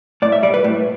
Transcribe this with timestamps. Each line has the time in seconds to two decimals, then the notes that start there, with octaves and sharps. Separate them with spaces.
0.22 A2 D5
0.32 E5
0.43 G3 D5
0.54 B4
0.64 A2